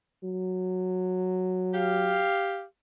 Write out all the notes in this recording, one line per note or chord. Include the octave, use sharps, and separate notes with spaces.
F#3
G4 F5